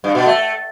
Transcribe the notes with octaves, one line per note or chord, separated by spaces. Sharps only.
G2
B2
A3